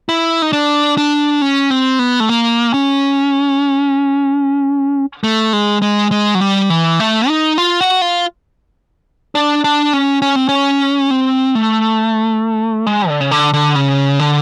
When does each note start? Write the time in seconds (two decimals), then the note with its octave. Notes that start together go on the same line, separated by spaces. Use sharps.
0.09 E4
0.42 D#4
0.53 D4
0.97 D4
1.42 C#4
1.70 C4
1.99 B3
2.20 A3
2.29 A#3
2.74 C#4
5.24 A3
5.53 G#3
5.82 G#3
6.11 G#3
6.35 F#3
6.40 G3
6.70 E3
7.00 A3
7.28 D#4
7.58 F4
7.81 F#4
8.02 F4
9.35 D4
9.64 D4
9.93 C#4
10.22 C#4
10.36 C4
10.49 C#4
11.11 C4
11.55 A3
12.87 G#3
13.09 D3
13.21 C#3
13.31 D3
13.53 D3
13.75 C#3
14.19 D3